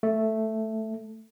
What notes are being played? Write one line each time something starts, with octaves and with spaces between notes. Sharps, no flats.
A3